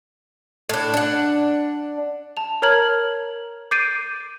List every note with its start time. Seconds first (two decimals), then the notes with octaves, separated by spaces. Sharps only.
0.69 A2 D4
0.94 D4 F#5
2.37 A5 F7
2.62 A#4 C#5 A#5 F6 G#6 F#7
3.71 D6 G6 A6 C7 D7 D#7